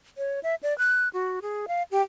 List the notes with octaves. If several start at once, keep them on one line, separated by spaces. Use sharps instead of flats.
C#5
E5
D5
F#6
F#4
G#4
F5
G4